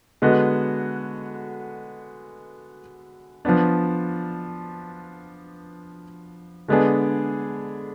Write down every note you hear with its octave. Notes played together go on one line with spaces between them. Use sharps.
D3 G#3 B3 F#4
F3 B3 D4
D3 G#3 B3 D4 G#4